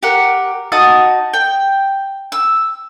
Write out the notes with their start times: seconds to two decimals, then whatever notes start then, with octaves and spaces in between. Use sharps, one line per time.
0.03 G4 A#4 F#5
0.72 D#4 F#4 A5 D#6
1.34 G5
2.32 E6